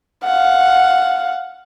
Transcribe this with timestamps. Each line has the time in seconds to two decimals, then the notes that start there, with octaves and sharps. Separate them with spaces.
0.24 F5 F#5